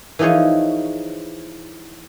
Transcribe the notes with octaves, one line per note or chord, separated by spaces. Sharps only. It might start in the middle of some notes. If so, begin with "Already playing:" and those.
E3 F3 D#4 G#4 C#5